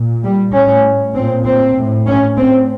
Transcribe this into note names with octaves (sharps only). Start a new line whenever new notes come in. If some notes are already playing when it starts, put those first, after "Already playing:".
Already playing: A#2
G3
A2 C#4
A#2 C4
C4
A2
C#4
A2 C4